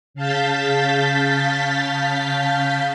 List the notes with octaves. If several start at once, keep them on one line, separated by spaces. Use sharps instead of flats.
C#3 F5 A5 G6 A6 B6